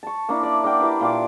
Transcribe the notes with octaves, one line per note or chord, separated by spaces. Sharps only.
A5 C#6
A#3 D4 E4
D5
D4 A#4 F#5 G5
E4 G4 B4 D6
A#2 F4 G5 D6